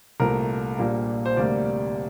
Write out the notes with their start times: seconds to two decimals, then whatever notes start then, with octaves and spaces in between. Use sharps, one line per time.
0.20 C2 A#2 A3 A#4
0.78 A#1 A#2 G3 A#3
1.26 C5
1.36 D2 C3 G3 A#3 D5